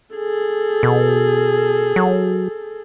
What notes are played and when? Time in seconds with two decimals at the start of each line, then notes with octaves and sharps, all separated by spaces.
0.16 G#4 A4
0.83 B2
1.96 F#3